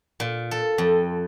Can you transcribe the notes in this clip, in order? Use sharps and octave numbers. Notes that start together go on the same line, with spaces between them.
A#2
A4
F2